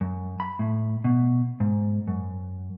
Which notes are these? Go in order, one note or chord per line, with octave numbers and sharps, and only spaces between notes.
F#2
B5
A2
B2
G#2
F#2